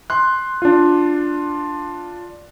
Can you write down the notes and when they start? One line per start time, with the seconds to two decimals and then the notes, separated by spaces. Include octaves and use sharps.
0.10 C6 F#6
0.62 D4 F4